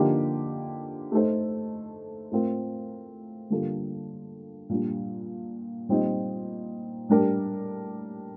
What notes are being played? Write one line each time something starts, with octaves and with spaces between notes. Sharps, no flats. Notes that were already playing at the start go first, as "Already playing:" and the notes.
Already playing: D3 F3 A#3 D#4 G4
A3 D#4 A4 C5
A2 A3 C4 F4 A#4
D3 G3 A#3 F4 A4
A#2 G3 D4
A#2 G3 C4 D#4
A2 G3 D4 G4 A#4